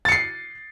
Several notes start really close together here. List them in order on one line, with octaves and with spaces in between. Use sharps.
A6 C#7 C7